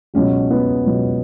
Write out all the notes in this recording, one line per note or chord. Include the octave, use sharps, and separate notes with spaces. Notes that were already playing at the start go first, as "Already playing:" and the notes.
C#2 B2 F#3 C#4
B3
C#2 B2 F#3